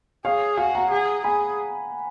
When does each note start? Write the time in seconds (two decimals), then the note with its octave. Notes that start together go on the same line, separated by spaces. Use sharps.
0.25 G#4 C#5 F5
0.57 F#4 F5 G#5
0.74 F#5 A#5
0.91 G#4
1.24 G#4 G#5 B5